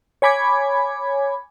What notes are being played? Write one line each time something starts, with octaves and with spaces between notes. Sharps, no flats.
C#5 G#5 B5 D6 G#6